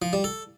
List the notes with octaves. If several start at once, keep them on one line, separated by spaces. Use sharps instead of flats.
F3
G3
A4